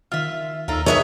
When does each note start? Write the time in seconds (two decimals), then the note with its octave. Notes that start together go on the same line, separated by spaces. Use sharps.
0.12 D#3 F4 E5 F6
0.68 D#2 D#4 F4 A4 A#4 E6
0.86 B3 D#4 G#4 C#5 D#5 E5 A5 C#6